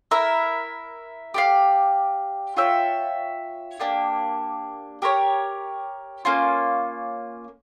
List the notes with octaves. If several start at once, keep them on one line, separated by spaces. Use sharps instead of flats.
E4 A#4 E5
G4 D5 F5
F4 C#5 E5 G5
A#3 D4 G4
G4 A#4 C#5
A#3 C#4 F4